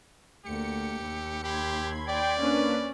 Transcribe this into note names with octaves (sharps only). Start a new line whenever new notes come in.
D2 A#3 G4 C#7
D#2
G4 B5 C6 G#6
D5 G5
A#3 C#4 D4 B4